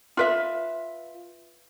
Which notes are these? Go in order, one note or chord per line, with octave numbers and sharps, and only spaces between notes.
F4 B4 E5